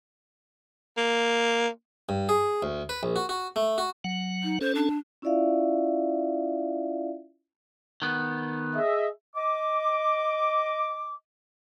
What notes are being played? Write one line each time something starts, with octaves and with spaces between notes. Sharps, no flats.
A#3
G2
G#4
D2
B4
A#1
F#4
F#4
A3
F#4
F#3 F#5
D#4
C#4 A4 C5
D4
C#4 E4 F4 D5 E5 F5
D#3 B3
G#4 D#5 E5
D#5 D6